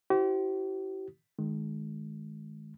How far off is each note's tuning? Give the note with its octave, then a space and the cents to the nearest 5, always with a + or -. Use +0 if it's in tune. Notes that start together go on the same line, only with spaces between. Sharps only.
E4 +0 G4 -40 C5 +0
D#3 -10 G#3 +25